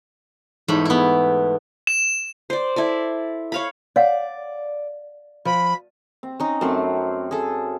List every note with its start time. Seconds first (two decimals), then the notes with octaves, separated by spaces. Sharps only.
0.68 E2 G#2 A3 B5
0.85 B3 E4
1.87 E7
2.50 C5 D5
2.76 E4 A4 D5
3.52 C#5 F5 B5
3.96 C#5 D5 F5 F#5
5.45 F3 B5
6.23 C4
6.40 C#4 D#4
6.61 F#2 A3 C4 C6
7.31 G#4 A4